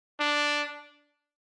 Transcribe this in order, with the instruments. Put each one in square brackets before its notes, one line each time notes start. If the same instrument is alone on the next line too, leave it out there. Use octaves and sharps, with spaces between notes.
[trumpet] D4